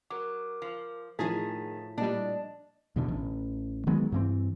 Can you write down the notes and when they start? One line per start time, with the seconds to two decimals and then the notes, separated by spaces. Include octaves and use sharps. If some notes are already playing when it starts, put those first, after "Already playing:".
0.10 F#3 A#4 D6
0.62 F3
1.19 A2 D#3 F3 G#4 A5 A6 B6
1.98 A#2 G3 D4 D5 D#5
2.96 E2 B2 D3
3.08 A1
3.87 D#3 F#3 G#3 B3
4.12 G2 E3 C4